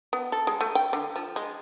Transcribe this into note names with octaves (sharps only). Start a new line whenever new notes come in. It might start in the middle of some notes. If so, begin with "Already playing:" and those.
B3
A4
G#3
A3
G5
D3
F3
G#3